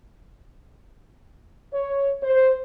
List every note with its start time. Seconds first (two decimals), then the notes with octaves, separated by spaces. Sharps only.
1.73 C#5
2.23 C5